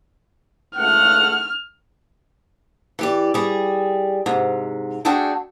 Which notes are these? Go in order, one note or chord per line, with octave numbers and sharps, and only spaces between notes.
C#2 A3 F#5 F6
E3 G4 D5
G3 G#4
G#2 C3
A3 D4 F#4 G#4 A4 G5